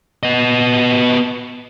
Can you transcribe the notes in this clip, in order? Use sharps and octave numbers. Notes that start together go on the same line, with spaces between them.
B3 D#5